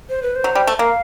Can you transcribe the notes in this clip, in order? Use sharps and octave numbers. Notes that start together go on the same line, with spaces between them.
C5
B4
C5
F#3
G3
A3
A#3 F5